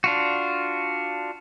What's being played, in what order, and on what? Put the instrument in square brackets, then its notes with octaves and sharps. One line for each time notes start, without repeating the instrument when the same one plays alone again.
[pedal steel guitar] D4 F4 F#4